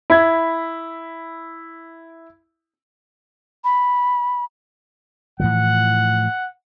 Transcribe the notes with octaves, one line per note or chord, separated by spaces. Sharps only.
E4 B5 G#6
B5
A2 E3 F3 F#5